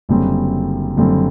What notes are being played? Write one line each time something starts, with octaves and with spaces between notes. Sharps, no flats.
F#1 F#2 D3 G3 C4
F#1 F#2 D3 G3 C4